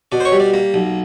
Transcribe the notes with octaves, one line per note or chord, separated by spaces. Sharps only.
B2 D5
C5
C#5
G3
D5
A#3
B1